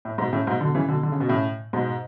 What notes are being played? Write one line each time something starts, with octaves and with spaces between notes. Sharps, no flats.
A2
G#2 B2
A2 C#3
G#2 B2
B2 D3
C#3 E3
B2 D3
D3
C#3
B2
A2 C#3
G#2 B2